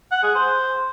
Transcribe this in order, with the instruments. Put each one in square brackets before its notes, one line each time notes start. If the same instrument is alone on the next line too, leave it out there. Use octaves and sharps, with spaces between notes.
[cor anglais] F#5
G#4
C5